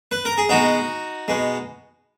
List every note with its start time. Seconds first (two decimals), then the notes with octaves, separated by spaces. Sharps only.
0.11 B4
0.25 A#4
0.38 G#4
0.49 B2 G#3 D#4 F#4
1.28 B2 G#3